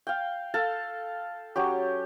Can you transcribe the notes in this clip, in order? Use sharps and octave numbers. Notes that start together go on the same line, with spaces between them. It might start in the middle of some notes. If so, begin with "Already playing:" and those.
F5 G5
A4 F5 A5
F#3 C#4 G4